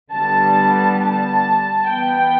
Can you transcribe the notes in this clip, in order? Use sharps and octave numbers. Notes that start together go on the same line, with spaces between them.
D3 G3 B3 A5
A5
E3 B3 G5